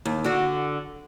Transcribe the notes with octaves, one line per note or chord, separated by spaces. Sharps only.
D#2
D3 F#4